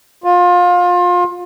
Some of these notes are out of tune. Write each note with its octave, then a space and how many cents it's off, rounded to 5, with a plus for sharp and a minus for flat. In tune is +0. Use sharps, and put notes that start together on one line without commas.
F4 +25